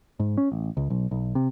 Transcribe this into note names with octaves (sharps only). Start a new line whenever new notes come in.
G#2
C#4
A1
C#2
B1
B1
C3